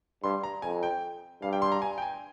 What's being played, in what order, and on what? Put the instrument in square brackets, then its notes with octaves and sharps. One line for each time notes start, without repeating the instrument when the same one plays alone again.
[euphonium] G2 [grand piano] C6
[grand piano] A#5
[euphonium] F2 [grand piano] G#5
[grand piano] G5
[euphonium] G2 [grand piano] F5
[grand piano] G5
C6
A#5
G#5
G5
G#5